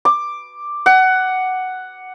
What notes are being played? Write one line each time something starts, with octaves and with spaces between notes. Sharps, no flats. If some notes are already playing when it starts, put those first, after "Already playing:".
D6
F#5